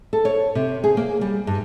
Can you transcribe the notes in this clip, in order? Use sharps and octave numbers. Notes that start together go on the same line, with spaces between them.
A4
C#5
C3
G#4
A#3
G3
G2